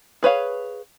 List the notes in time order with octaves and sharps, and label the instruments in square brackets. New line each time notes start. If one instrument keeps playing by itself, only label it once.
[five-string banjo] G#4 B4 C#5 F5